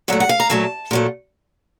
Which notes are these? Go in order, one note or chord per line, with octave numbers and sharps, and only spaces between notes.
A#2 F#3 A3 F#5
F#5
F5
A#5
A#2 F#3 A3 A5
A#2 F#3 A3